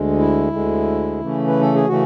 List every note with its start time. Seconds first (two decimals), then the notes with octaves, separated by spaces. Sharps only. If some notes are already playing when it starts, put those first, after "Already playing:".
Already playing: D2 D3 G#3
0.19 E4
0.52 D2 D3 G#3
1.21 C#3 E3 A3 C#4
1.47 B4
1.61 A4
1.75 G#4
1.88 C#3 E3 A3 C#4 F#4